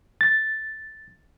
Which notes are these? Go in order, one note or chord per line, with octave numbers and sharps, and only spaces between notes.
A6